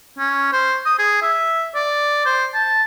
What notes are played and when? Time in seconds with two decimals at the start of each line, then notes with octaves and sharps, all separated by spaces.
0.18 C#4
0.52 C5
0.85 D#6
0.99 G#4
1.22 E5
1.75 D5
2.26 C5
2.54 A5